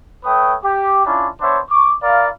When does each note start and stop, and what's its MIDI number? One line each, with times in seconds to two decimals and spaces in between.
0.24 0.55 57
0.24 0.55 71
0.24 0.55 73
0.24 0.55 79
0.24 0.55 87
0.63 1.05 67
1.05 1.28 61
1.05 1.28 62
1.05 1.28 64
1.05 1.28 65
1.41 1.59 59
1.41 1.59 62
1.41 1.59 72
1.41 1.59 73
1.41 1.59 76
1.70 1.93 85
1.70 1.93 86
2.03 2.29 64
2.03 2.29 70
2.03 2.29 74
2.03 2.29 77